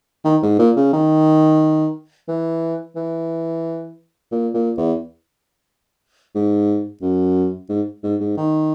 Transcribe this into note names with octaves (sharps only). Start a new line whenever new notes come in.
D#3
G#2
A#2
C#3
D#3
E3
E3
A#2
A#2
E2
G#2
F#2
G#2
G#2
G#2
D#3